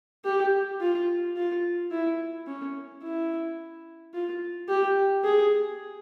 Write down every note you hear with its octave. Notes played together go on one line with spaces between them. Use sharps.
G4
F4
F4
E4
C#4
E4
F4
G4
G#4